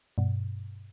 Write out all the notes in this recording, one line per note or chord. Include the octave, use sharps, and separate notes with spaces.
G2 B2